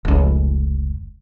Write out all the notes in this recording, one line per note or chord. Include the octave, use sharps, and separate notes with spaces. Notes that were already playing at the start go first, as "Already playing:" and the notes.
F1 C#2